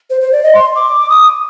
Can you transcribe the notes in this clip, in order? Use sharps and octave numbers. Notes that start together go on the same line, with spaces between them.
C5
C5
D5
D#5
C6
D6
D#6